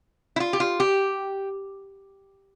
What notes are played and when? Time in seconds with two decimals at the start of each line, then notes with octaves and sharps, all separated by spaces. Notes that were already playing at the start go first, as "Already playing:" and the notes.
0.36 E4
0.40 F4
0.53 G4
0.60 F4
0.80 G4